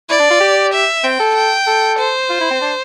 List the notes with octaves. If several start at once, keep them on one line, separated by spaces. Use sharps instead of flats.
E4 D5
D4
F4
G4
E5
C4 G5
A4
G5
A4
C5
F4
E4
C4
D4